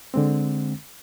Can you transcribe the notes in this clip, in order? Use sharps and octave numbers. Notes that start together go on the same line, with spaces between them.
D3 G#3 C4